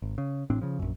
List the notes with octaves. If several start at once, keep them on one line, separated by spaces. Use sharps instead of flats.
G#1
C#3
A1 A2 C4 D4
C#3 F3
A#1 F#2